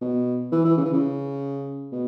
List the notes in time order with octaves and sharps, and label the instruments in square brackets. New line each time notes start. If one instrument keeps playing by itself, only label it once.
[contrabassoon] B2
E3
E3
C#3
E3
C#3
B2